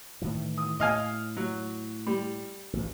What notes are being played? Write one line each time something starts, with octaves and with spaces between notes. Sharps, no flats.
A2 D#3 E3
D#6
A2 D#5 F5 G#5
F#3
G3
A1 G2